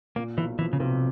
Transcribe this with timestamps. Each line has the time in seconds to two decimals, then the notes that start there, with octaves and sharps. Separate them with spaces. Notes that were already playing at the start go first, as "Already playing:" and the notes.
0.16 A#2 A#3
0.37 B1 E3
0.59 E3 F3
0.73 C#3
0.80 B1 C3